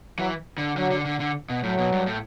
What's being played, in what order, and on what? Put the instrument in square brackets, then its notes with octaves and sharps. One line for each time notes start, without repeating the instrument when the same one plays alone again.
[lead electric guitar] E3 [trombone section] F#3
[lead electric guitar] D3
[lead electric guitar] D3 [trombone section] F#3
[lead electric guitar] D3
D3
D3
B2
[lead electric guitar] A2 [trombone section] F#3
[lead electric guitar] B2
G2
A2